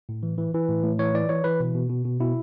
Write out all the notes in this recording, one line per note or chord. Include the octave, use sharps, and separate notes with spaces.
A2
E3
E3
E3
A2
A2
E3 C#5
E3 D5
E3 C#5
E3 B4
B2
B2
B2
B2
B2 E4